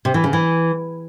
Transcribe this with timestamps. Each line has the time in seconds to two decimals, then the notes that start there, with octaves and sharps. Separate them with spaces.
0.05 C3
0.14 E3
0.24 C#3
0.33 E3